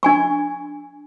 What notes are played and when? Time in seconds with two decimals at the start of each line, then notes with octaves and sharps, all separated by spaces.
0.03 D4 G#5 C#6